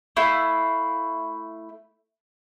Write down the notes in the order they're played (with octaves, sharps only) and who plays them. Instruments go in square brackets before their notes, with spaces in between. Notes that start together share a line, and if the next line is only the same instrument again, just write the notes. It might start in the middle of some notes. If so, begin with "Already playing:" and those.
[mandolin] A3 E4 F5